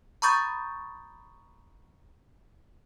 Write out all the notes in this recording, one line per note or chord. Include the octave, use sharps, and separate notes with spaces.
A#5 B5 C#6 D#6 G6 A6